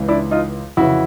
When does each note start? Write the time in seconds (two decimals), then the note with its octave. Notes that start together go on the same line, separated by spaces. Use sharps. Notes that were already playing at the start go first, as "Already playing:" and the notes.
Already playing: C#2 C#3 E3
0.08 D4 E4
0.31 D#4 F4
0.77 F2 C#3 E3 E4 F#4